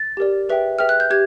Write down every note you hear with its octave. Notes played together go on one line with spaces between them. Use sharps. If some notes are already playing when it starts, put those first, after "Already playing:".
Already playing: A6
G4 A#4 D5
G#4 B4 E5 G5
G#4 B4 E5 G5 F6
F#6
G6
G4 G#6